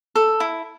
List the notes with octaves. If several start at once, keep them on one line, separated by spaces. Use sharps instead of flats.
A4
E4